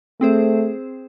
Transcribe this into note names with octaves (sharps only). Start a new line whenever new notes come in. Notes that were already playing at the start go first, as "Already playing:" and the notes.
A3 C4 G#4 C5